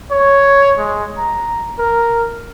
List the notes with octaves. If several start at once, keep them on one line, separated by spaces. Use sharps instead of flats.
C#5
G#3
A#5
A#4